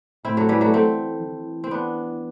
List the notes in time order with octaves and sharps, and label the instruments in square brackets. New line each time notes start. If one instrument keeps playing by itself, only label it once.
[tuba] A2 [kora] C4 E4
[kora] F#3 A3
E3 G3
F#3 A3
[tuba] E3 [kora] A3 C4
[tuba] E3
[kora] C4
B3 D4